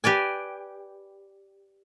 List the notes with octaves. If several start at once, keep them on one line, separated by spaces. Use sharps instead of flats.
G4 B4 D5 G#5